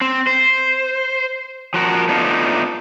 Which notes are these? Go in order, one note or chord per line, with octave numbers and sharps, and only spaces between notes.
C4
C5
F3 F#4 A#4
A3 B3 D4 D#4 F4